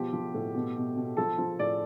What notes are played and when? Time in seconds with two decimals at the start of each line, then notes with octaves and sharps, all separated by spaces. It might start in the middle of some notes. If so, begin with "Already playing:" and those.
Already playing: B2 F3 G4
0.13 F3
0.34 A2
0.54 B2
0.76 B2
0.96 B2
1.17 F3 A4
1.38 F3
1.59 A2 D5